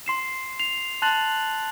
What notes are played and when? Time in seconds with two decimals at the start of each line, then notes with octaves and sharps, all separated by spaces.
0.06 C6 C7 E7
0.60 C7 F7
1.02 A5 C6 F#6 A6 F7 F#7